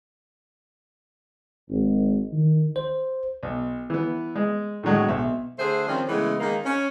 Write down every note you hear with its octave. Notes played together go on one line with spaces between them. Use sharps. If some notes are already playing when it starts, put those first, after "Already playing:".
G#1
D#3
C5
B1
E3 B3
G#3
A2 D3 F#3 G#3
B1 E5
D3 A3 G#4 C5
D#3 F3 G3 C4 C#4
C#3 E3 G#3 A3 B3
D#3 G#3 A#3 D#4
C#4